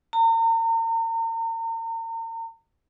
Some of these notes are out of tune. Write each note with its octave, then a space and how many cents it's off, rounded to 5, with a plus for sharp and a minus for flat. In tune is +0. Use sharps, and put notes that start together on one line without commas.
A#5 -40